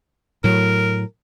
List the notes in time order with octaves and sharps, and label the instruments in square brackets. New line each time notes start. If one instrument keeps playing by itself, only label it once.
[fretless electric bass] A2 F#3 [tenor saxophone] A#4